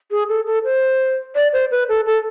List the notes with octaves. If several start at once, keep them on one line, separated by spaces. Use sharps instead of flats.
G#4
A4
A4
C5
D5
C5
B4
A4
A4